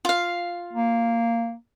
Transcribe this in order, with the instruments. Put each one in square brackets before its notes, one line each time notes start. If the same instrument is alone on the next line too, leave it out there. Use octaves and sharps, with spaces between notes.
[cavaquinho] F4 F5
[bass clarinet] A#3